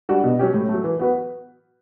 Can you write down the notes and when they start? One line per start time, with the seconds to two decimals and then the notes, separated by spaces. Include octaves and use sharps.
0.09 G3 D4 F#4
0.24 B2
0.39 F#3 C#4 G4
0.54 A2
0.69 A3
0.74 F#3
0.84 E3
0.99 B3 F#4 B4